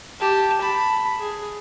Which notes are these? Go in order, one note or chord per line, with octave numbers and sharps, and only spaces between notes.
G4 A5
A5 B5
G#4